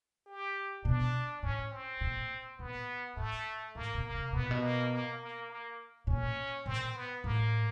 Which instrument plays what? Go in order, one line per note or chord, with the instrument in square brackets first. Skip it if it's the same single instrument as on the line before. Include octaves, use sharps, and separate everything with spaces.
[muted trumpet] G4
[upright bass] B2 [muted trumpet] D4
[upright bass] A2 [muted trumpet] C#4
[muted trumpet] C4
[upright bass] A#2
[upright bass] A#2 [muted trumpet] B3
[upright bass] A2 [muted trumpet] A3
[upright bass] A2 [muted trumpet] A#3
[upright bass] B2
[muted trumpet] A#3
[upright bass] C3
[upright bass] B2 [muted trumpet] B3
[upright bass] A#2
B2
[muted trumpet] A#3
A#3
A#3
A#3
[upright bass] A#2 [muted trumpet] C#4
[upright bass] A#2 [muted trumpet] C4
[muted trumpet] B3
[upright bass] A2 [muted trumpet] A#3